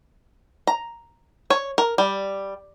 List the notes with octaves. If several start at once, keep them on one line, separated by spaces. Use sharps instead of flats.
A#5
C#5
A#4
G3